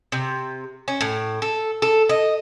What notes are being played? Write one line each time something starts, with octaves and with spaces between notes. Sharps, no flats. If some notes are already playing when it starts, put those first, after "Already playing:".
C3
C#4
A2
A4
A4
D#5